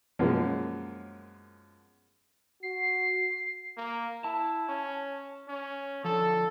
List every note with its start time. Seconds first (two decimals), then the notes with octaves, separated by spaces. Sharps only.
0.19 F#2 B2 F3 G#3 A#3 C#4
2.63 F#4 C7
3.77 A#3
4.24 E4 A5
4.68 C#4
5.49 C#4
6.04 D3 F3 A4